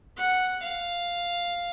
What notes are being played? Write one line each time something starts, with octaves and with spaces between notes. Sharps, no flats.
F#5
F5